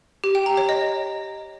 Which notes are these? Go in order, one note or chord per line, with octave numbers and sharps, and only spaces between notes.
G4
G5
A#5
C#5
D#5